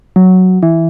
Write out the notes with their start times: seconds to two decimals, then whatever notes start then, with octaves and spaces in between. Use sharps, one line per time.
0.16 F#3
0.63 E3